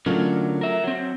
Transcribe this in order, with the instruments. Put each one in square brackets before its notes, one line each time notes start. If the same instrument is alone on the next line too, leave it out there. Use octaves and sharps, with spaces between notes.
[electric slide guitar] D3 C#4 A#4 [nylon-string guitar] F#3 A3 F4
[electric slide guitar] A#4 E5
F#3 C4